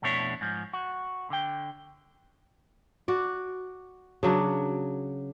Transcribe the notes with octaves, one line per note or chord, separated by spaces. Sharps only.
F2 B2 A3 D4 E4 C#5
G#2 F3
F#4
D3 G5
F#4 D5
C#3 F#3 D4